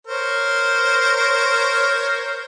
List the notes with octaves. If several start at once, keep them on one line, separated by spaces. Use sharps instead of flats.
A#4 C5 C#5